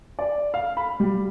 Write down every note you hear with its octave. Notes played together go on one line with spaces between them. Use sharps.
D5
F5
B5
G3